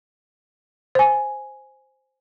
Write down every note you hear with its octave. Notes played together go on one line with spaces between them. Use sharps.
C5 G#5